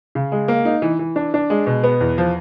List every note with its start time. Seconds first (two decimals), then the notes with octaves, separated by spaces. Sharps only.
0.15 C#3
0.32 G#3
0.48 A#3
0.65 D#4
0.82 E3
0.99 E3
1.16 D4
1.34 D4
1.50 G#3
1.66 B2
1.83 B3
2.01 E2
2.18 F3